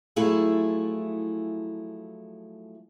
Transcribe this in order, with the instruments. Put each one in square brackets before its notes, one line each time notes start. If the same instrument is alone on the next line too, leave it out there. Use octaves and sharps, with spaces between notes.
[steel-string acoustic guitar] F3 F#3 A3 E4 G#4